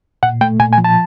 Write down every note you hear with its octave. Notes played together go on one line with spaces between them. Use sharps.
A#2 F#5
A3 G5
A#2 G#5
G#5
F3
A5